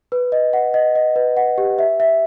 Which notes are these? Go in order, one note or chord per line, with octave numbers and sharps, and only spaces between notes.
B4
D#5
F#5
D#5
D#5
B4
F#5
G4
E5
E5